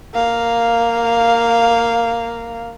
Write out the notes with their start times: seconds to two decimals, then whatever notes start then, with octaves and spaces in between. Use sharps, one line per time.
0.14 A#3 F5